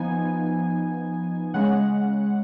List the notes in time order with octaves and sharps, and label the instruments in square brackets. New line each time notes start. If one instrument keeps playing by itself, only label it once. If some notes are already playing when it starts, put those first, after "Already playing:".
Already playing: [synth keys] F3 B3 D#4 G#5
C#3 G#3 C#4 F#5